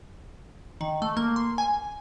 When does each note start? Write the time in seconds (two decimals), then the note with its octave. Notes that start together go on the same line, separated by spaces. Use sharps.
0.81 D#3
1.02 A3
1.17 A#3
1.36 C6
1.58 G#5